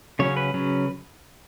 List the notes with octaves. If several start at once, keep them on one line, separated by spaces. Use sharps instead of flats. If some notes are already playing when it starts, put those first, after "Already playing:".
C#3 F#3 C#4 C#5
B4
C#3 F#3 C#4